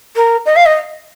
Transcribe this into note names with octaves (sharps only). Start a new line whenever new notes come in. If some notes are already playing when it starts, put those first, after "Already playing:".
A#4
D#5
F5
D#5